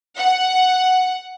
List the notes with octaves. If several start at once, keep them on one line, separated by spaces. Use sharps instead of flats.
F#5